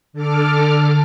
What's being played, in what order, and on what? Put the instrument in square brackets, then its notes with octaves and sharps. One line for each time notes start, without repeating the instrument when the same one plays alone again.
[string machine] D3 A4 D6 F6